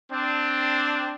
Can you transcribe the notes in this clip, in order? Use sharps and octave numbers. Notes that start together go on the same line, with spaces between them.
C4 D4